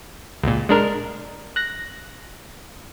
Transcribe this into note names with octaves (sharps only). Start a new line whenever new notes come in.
C#2 A#2
G#3 D4 A#4
F#6 A#6